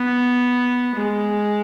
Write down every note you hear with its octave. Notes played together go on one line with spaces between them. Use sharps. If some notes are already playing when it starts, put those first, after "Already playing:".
Already playing: B3
G#3